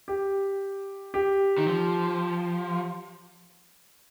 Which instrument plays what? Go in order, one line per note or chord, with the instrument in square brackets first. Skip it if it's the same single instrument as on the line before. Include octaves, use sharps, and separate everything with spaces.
[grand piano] G4
G4
[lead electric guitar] D#3
F3